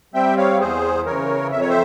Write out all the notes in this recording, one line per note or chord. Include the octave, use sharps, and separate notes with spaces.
G3 C4 E5 G5
C#5 F5
E2 G#4 C5
C#3 E3 A#4 C#5
F2 E5
C#5
C5 E5